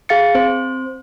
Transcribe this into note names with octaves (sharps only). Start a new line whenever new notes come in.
G#4 F5 A6 C#7
C4 C5